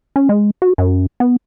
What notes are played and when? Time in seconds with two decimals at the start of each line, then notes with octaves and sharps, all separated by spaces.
0.16 C#4
0.29 G#3
0.62 F#4
0.78 F#2
1.20 B3